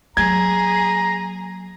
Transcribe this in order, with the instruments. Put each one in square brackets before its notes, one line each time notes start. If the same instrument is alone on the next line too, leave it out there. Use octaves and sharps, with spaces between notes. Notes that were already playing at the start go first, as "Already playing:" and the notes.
[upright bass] F#3 A#3 [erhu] G#4 [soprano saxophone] A#5 [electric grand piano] G#6